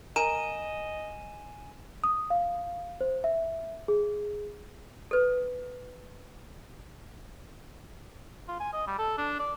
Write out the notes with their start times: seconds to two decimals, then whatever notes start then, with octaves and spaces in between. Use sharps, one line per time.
0.16 A#4 D#5 G#5 D#7 E7
2.04 D#6
2.30 F5
3.01 C5
3.24 E5
3.88 G#4
5.11 A4 B4
8.48 F4
8.60 G#5
8.73 D#5
8.87 G3
8.99 A4
9.18 D4
9.39 D5